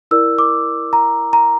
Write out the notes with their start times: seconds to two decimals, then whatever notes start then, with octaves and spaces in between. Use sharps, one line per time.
0.11 E4 A#4 D5 E6
0.38 D6
0.93 A#5
1.33 A#5